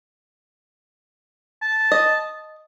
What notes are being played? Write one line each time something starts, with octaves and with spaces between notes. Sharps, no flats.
A5
D#5